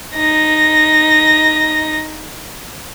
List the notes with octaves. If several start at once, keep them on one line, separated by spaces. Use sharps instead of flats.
D#4 A#6